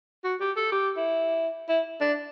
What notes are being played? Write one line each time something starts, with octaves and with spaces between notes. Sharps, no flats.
F#4
G4
A4
G4
E4
E4
D4